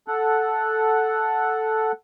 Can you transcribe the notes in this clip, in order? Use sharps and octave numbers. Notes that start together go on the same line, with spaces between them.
A4 F#5